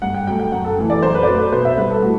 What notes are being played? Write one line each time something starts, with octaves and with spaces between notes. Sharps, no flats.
G2 F#5
G5
F#3 A3 G5
G5
F#2 F#5
A4
E3 A3
D5
F#2 C5
B4
D5
F#3 A3 C5
B4
B2 C5
E5
G3 B4
A4
A2 F#4